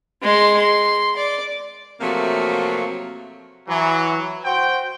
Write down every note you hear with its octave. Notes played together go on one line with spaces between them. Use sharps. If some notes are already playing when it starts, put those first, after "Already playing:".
G#3 C6
C6
D5
C3 F3 F#3 A3 A#3
E3 F#3
F#4 C5 G5